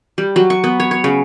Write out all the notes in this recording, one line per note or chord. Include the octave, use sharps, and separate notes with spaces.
G3
F#3
C#6
B3
C#5
C#5
C#3